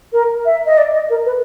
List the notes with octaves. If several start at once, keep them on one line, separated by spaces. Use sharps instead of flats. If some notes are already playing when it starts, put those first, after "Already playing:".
A#4
E5
D#5
D5
D#5
A#4
B4